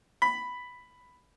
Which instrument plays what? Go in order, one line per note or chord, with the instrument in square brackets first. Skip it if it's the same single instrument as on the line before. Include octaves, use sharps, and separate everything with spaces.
[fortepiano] B5